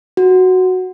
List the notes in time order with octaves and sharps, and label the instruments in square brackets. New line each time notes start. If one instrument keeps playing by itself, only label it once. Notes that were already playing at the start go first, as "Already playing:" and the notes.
[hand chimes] F#4